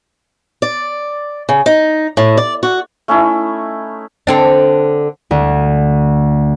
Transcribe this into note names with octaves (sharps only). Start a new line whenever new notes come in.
D5
C#3
D#4
A2
D5
F#4
A3 C#4 D#4 E4
D3 C4 D4
D2